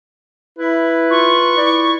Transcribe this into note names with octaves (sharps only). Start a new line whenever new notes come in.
E4 B4
F4 C#6
E4 D5